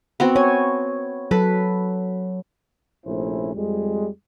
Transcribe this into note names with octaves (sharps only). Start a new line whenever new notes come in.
B3 C4 F#4
C#5 G#5
F#3 A4 B4
A#1 C3 A3 C#4 E4 C5
F2 G3 G#3